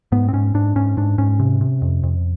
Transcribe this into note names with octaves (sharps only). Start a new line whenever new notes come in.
G#2 B3
C4
G#2 C#4
G#2 D4
G#2 C#4
G#2 D4
G#2 C#4
C3
C3
F2
F2